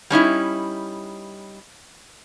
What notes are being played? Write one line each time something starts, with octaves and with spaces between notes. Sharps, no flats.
G3 C#4 D#4 E4